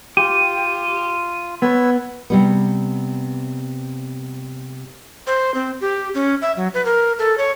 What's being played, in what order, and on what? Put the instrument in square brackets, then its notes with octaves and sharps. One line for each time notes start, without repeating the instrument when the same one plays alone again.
[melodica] F4 [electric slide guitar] G4 [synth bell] D#7
[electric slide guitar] B3 [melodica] B4 C#5 E6
[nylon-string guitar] C3 G3 B3
[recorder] C5
C4
G4
C#4
E5
F#3
B4
A#4
A4
C#5